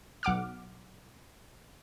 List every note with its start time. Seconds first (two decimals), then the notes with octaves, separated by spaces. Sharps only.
0.23 B1 F#5 D6 F6